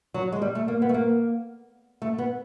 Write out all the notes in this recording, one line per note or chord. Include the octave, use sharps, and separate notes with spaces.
F#3
G#3
G3
A3
A#3
B3
A3
A#3
A3
B3